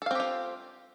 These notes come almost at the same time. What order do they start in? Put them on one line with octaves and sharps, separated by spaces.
A4 F5 C4 G4 F4